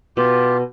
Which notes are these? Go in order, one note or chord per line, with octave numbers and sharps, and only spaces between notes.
B2 F4 G4